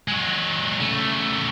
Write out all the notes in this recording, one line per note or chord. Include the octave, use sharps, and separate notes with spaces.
F#3 G#3
C#3 A3